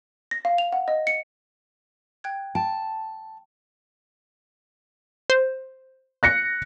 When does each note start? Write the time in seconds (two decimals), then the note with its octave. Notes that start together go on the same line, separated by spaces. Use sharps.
0.31 A#6
0.45 F5
0.58 F7
0.73 F#5
0.88 D#5
1.07 C#7
2.24 G5 F#6 G#6
2.55 G5 A5
5.30 C5
6.23 F#6 A#6 C#7